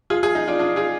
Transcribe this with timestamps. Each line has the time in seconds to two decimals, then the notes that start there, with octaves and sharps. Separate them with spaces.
0.10 F4 G#4
0.23 F4 G#4
0.35 D#4
0.48 D4 F4
0.59 D4 F4
0.76 F4 G#4